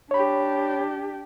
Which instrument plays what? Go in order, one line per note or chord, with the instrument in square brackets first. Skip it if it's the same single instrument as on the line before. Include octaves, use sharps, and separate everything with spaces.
[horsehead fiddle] D4 G4 [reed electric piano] C#5 B5